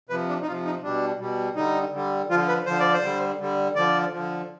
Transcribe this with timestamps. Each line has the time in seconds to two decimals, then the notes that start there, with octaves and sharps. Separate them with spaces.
0.09 C3 F3 B4
0.28 D4
0.42 D#4
0.46 C3 F4
0.50 F3
0.65 D#4
0.83 B2 G3 D4
1.20 B2 G3
1.56 D3 G3 D#4
1.92 D3 G3
2.29 F3 F4
2.34 D3
2.48 B4
2.66 D3 F3 C5
2.80 D5
2.94 C5
3.03 D3 G3
3.39 D3 G3
3.76 D3 F3 D5
4.13 D3 F3